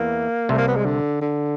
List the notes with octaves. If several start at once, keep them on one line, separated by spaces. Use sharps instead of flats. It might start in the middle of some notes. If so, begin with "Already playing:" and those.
Already playing: E2 E3 A#3
C2 C3 A3
A#3
B3
G#3
D3
D3